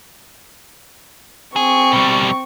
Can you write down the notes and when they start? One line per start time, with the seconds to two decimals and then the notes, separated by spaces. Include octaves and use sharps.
1.56 C4 G#4 C#6
1.93 B2 G3